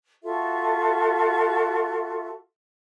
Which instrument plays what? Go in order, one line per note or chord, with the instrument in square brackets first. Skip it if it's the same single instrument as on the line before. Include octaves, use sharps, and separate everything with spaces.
[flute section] F4 F#4 A4 E5